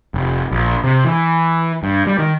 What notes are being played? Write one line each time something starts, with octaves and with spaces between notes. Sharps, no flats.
F1
A#1
C3
E3
G2
G3
D#3